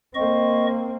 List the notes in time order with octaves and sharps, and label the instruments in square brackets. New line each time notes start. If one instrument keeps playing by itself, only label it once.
[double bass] A#3 C4 [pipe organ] D#5 C#6